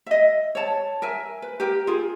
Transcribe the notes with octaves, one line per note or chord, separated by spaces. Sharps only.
D#5 E5
C#5 A5
A#4 E5 G#5
B4
G4 A#4
F4 G#4